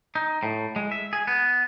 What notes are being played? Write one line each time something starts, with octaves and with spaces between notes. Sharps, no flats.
D#4
A2
G#3
E5
G#4
B3